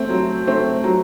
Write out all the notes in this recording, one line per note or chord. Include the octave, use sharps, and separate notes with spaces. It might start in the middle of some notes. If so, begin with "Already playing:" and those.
Already playing: A3 C4
F#3
A3 C4
F#3